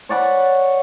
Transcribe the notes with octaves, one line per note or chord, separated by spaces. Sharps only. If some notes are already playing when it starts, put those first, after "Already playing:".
C#5 D5 F#5 B5